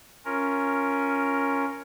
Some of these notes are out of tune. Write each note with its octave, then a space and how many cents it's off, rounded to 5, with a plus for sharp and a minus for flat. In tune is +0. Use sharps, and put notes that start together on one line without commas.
C#4 +0 F4 +0 A#4 +0